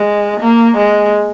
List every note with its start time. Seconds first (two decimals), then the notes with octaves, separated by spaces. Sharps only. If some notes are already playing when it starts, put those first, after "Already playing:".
Already playing: G#3
0.41 A#3
0.77 G#3